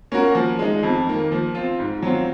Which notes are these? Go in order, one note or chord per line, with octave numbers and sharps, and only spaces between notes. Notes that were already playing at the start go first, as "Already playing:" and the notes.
A#3 C#4 F#4 A#4
F3
G#3 D#4
F2
D#3 A#3
F3
C4 F4
G#2
F#3 C4 F4